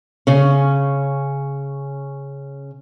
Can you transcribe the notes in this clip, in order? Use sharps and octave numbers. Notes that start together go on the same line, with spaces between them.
C#3 C#4